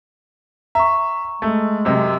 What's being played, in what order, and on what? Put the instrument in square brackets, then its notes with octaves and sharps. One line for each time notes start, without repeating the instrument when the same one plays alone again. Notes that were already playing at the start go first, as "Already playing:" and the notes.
[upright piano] E5 [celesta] A#5 C#6
[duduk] G#3 [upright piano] A3
[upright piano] F#2 C3 D#5